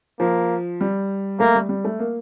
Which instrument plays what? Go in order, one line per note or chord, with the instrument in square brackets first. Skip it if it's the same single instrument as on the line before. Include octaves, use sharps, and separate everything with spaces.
[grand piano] F3 [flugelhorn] A#3
[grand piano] G3
[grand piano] A3 [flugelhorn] A#3
[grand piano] G3
G3
A3
A#3